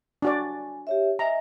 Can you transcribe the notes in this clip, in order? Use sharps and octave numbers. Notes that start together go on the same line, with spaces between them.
D4 F#4 D5 G#5
G4 C#5 E5
D#5 E5 G#5 A#5